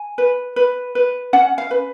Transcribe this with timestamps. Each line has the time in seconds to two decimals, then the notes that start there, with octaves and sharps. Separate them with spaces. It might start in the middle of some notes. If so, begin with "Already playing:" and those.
Already playing: G#5
0.18 B4
0.56 B4
0.95 B4
1.33 C#4 F#5
1.58 F5
1.71 B4